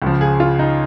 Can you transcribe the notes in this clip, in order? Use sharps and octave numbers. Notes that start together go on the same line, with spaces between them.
C#2 C#3 F3
G#4
F4
D#4